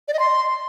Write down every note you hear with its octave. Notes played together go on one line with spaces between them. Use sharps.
D5
D#5
C6